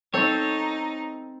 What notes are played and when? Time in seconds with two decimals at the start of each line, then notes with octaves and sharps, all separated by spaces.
0.14 C4 D#4 A4 C5 C#5